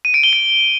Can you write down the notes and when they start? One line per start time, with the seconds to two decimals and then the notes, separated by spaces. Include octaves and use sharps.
0.05 D#7
0.14 D7
0.23 G7
0.33 D7